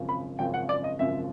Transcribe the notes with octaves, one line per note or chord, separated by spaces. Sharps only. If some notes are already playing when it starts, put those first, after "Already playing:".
Already playing: G#1 F#2 C#3 F3
B5
G#1 F#2 C#3 F3 G5
F#5
D5
D#5
G#1 F#2 C#3 F3 E5